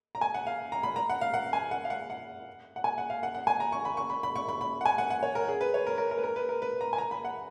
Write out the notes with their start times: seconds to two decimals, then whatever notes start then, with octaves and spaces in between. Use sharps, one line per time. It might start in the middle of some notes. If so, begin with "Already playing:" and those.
0.15 A#5
0.21 G#5
0.34 F#5
0.47 F5
0.72 A#5
0.83 B5
0.96 A#5
1.09 F#5
1.21 F5
1.34 F#5
1.53 G#5
1.71 F#5
1.85 F5
1.90 F#5
2.10 F#5
2.76 F#5
2.84 G#5
2.98 F#5
3.10 F5
3.23 F#5
3.35 F#5
3.47 G#5
3.60 A#5
3.72 C#6
3.85 B5
3.97 C#6
4.10 B5
4.23 B5
4.36 C#6
4.49 B5
4.61 B5
4.81 F#5
4.86 G#5
4.98 F#5
5.10 F#5
5.23 C#5
5.35 A#4
5.48 G#4
5.61 B4
5.74 C#5
5.87 A#4
5.98 A#4
6.11 A#4
6.18 B4
6.24 A#4
6.36 B4
6.49 A#4
6.62 B4
6.81 A#5
6.93 G#5
6.98 A#5
7.11 B5
7.25 F#5